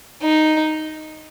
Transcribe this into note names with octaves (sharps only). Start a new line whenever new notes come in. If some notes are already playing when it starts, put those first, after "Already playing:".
D#4